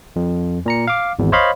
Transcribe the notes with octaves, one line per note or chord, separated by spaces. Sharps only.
F2
A#2 A#5 C#7
F5 D6
G#1 E2
C5 C#5 D#5 F5 B5 C6